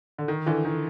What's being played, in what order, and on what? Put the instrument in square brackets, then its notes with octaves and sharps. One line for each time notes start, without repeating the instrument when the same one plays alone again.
[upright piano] D3
D#3
D3 E3
D#3